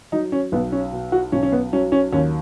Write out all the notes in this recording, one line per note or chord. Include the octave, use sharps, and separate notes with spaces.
F#3 D#4
C#4
B1 B3
C#4
B2
F#4
B1 C#4
C#4
B3
F#3 C#4
C#4
D#2 C#4